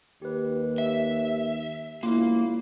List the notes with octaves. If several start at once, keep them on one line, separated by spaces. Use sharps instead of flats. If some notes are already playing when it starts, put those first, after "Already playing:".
D#2 G4 B4
E5
E1 A#3 E4 F4